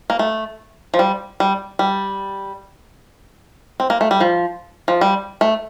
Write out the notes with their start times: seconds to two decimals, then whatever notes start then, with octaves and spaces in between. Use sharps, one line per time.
0.10 A#3
0.19 A3
0.94 F3
0.99 G3
1.40 G3
1.79 G3
3.80 C4
3.90 A#3
4.01 A3
4.11 G3
4.21 F3
4.88 F3
5.01 G3
5.41 A3